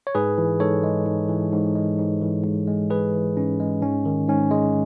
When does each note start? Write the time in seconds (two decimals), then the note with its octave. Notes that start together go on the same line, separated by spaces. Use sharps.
0.07 C#5
0.15 G#2 G#4 B4
0.38 E3
0.60 G#2 A4 C#5
0.84 G#3
1.06 G#2
1.29 E3
1.52 G#2
1.76 G#3
1.99 G#2
2.21 E3
2.44 G#2
2.68 G#3
2.90 G#2 G#4 B4
3.14 E3
3.37 G#2 C#4
3.60 G#3
3.82 G#2 C#4
4.05 D#3
4.28 G#2 C#4
4.51 G#3